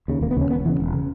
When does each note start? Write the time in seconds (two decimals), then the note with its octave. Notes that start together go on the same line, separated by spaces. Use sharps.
0.08 D#2 C#3
0.21 E1 A#3
0.31 B3
0.37 D#2 C#3 C#4
0.50 E1 B3
0.65 E2 C#3 E3
0.80 E1
0.94 C#3